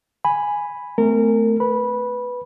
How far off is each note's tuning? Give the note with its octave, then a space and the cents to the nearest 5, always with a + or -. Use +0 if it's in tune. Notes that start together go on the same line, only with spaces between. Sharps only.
G#5 -5 B5 +0
A3 -5 C4 -45 A#4 -25
B4 +0 B5 -15